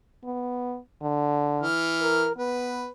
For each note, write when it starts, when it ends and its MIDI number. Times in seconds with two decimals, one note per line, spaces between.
0.25 0.78 59
1.02 1.64 50
1.61 2.29 52
1.61 2.29 89
2.02 2.37 70
2.37 2.87 59
2.37 2.90 71